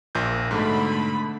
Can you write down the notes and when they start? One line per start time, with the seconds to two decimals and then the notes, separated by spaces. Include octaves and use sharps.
0.15 A#1 A#2 G6
0.51 G#2 B2 D3 A3 B5